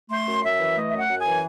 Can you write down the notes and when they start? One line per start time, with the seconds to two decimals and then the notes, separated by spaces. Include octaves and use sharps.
0.10 A3 C6
0.27 F#2
0.44 F#2 E5
0.60 E3
0.76 A3 D#5
0.90 E5
0.93 F#2
0.98 F#5
1.09 F#2
1.19 G#5
1.26 E3